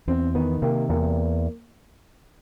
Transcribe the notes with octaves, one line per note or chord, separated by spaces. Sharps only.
E2 C4
D#3 B3
C3 A#3
E2 A#3